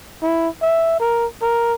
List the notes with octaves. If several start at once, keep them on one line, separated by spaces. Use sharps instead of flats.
E4
E5
A#4
A#4